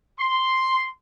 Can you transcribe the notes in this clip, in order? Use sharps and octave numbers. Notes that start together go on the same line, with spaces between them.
C6